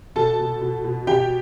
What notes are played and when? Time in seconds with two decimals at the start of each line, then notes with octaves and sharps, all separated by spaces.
0.16 B2 A4 A5
0.39 B2
0.61 B2
0.84 B2
1.07 B2 G4 G5